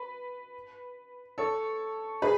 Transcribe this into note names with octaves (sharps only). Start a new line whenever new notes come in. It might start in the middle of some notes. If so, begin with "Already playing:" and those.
Already playing: B4
A4 C#5
G#4 B4